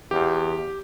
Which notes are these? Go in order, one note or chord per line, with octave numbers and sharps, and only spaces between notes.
E2 G4